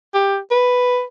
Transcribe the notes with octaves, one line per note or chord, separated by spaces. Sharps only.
G4
B4